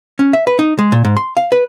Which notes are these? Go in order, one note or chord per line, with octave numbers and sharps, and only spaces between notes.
C#4
E5
B4
D#4
G#3
A#2
G#2
C6
F5
B4